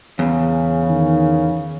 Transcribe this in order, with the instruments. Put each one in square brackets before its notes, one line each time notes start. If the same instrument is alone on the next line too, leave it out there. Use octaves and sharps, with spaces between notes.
[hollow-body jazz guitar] E2 [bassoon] C#3
[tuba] D#3